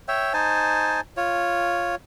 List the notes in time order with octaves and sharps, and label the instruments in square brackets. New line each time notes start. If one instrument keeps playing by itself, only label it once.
[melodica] C#5 E5 G5
D#4 C5 G#5 A5
F4 C#5